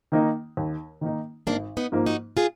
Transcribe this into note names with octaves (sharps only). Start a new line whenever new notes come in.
D#3 A#3 D#4
D#2
D#3 A#3 D#4
G#1 A#3 D4
B3 D#4
G#2 F3 A#3
D#4 F#4
F4 G#4